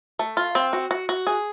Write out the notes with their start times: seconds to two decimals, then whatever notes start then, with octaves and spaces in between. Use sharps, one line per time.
0.19 A3
0.37 F4
0.55 C4
0.73 F#4
0.91 F#4
1.09 F#4
1.27 G#4